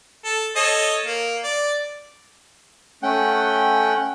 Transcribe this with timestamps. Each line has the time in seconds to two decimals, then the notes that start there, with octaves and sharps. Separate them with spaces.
0.25 A4
0.56 A4 C#5 D#5
1.06 A#3
1.44 D5
3.03 A3 C#4 F#5 G5